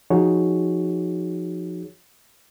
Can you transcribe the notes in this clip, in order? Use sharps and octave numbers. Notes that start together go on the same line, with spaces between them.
F3 D#4 F#4 G#4 C#5